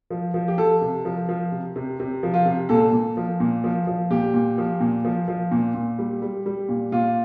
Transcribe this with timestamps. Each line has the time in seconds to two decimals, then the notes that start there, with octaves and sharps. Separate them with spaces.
0.10 F3
0.34 F3
0.48 G4
0.58 F3 A4
0.81 C3
1.05 F3
1.29 F3
1.52 C3
1.76 C3
2.00 C3
2.23 F3
2.34 F4
2.46 C3
2.69 A#2 A4
2.93 A#2
3.17 F3
3.40 A#2
3.64 F3
3.87 F3
4.10 A#2 G4
4.34 A#2
4.58 F3
4.80 A#2
5.05 F3
5.28 F3
5.51 A#2
5.75 A#2
5.99 G3
6.22 G3
6.46 G3
6.69 A#2
6.92 A#2 F4